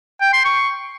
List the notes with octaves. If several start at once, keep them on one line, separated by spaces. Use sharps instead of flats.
G5
C6
C#6